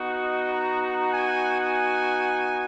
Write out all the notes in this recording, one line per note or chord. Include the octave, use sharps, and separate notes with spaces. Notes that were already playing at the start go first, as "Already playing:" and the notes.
Already playing: B3 D#4 F#4
D#5
A#5
A#5
G#5
G#5